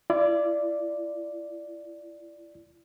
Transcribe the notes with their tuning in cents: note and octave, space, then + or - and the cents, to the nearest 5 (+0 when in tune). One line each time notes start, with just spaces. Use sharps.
E4 +45 D5 +0